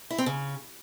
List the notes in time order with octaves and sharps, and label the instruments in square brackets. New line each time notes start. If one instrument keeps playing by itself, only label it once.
[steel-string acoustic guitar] E4
C4
C#3